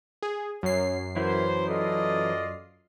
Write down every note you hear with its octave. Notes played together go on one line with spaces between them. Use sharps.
G#4
F#2 C#5 C7
E3 F#3 E4 A#4 C5
F4 A4 D5 D#5